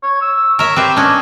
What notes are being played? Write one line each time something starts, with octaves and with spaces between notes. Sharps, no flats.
C#5
E6
A#4 C#5 E5
C4 G4 B4 E5
C#4 D4 D#5